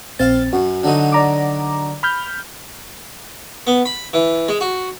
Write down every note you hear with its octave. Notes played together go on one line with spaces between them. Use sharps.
A#1 C4 C5 F5 A6
F#2 F#4
D3 F#3 D#4
D5 A#5 D6
B5 F6 G6
B3
B5
E3
G#3
F#4